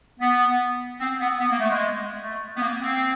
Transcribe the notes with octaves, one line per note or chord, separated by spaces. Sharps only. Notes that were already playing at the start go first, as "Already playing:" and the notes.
B3
C4
B3
B3
A#3
A3
G#3
A3
B3
A#3
C4